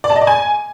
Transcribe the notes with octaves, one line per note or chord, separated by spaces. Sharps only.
D5
A5
D#5
D5
G#5